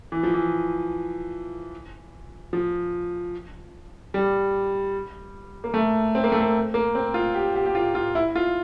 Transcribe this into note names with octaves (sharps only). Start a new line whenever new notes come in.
E3
F3
E3
F3
G3
A#3
A3
C4
A#3
A3
A#3
A#3
C4
F4
G4
G4
G4
F4
F4
E4
F4